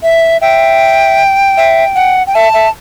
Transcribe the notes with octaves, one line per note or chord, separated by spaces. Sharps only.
E5
E5 G5
E5
F#5
G5
E5 A5
E5